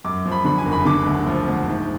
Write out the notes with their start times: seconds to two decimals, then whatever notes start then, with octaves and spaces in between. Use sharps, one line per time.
0.04 F#2 D6
0.25 F3
0.31 B5
0.45 D3 B5
0.58 G#5
0.66 F#1
0.72 B5
0.85 D3 D6
1.06 D2
1.27 F3
1.48 D2
1.67 G#2